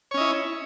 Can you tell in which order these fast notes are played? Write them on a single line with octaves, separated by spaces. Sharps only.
C#5 C#4 D#5 E4